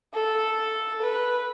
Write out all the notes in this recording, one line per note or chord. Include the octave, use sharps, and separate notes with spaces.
A4
B4